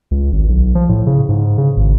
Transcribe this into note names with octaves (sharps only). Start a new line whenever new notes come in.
C#2
G#1
B1
F3
A2
C#3
G#2
C#3
G#1